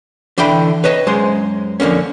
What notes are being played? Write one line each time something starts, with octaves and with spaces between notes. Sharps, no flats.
D3 E3 D4 G5 B5
B4 C#5 D#5 A5
F#2 G#3 G#4 C5
F2 D3 A#3 C#4